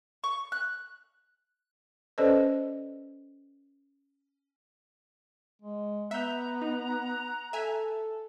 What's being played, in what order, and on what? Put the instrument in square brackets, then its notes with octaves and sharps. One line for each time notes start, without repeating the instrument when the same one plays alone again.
[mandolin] C#6
F#6
[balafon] C#4 A4 B4 C5 D5 D#5
[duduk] G#3
[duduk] B3 [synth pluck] E5 G6 [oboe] F#5 [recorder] A#5
[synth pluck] D#4
[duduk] A4 [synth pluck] E5 G#5